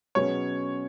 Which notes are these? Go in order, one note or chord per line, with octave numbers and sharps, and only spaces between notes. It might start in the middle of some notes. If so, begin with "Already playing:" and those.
B2 F#3 C#4 G#4 B4 C#5